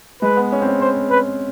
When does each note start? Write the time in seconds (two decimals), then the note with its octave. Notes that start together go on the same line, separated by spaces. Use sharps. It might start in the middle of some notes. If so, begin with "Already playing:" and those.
0.22 G#3 B4
0.37 B3
0.52 C#4
0.62 C4
0.67 C#4
0.81 C5
1.10 B4